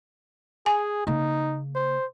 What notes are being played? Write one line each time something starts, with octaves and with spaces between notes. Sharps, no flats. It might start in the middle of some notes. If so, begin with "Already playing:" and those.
G#4 G#5
C#3 A#3 D#4
C5